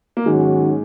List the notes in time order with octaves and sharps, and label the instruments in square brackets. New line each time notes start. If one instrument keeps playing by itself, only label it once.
[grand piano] A#3
[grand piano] G#2 G#3 [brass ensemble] D#3 F#3 C#4 F#4